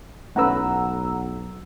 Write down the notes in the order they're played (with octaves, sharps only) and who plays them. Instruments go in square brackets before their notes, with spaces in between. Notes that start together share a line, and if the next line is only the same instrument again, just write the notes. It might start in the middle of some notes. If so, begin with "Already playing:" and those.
[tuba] B1 [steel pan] A3 C#4 B4 [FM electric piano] F#5 A#5 E6